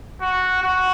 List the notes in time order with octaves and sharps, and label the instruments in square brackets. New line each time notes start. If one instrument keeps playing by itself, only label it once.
[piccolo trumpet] F#4
F#4